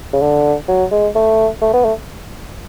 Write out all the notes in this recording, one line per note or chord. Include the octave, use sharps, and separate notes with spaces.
C#3
D3
F#3
G#3
A3
A3
B3
A3